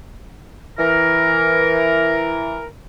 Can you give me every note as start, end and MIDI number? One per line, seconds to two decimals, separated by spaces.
0.78 2.65 52
0.78 2.65 70